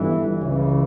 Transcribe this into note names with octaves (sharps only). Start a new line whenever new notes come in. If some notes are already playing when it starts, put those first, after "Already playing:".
Already playing: G1 G2 E3
C#2 C#3 E3